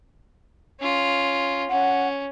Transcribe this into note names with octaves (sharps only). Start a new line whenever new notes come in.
C#4 F4
C#4 F#5